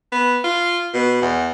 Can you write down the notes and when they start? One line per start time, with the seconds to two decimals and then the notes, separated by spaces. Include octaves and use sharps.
0.12 B3
0.44 F4
0.94 B2
1.22 E2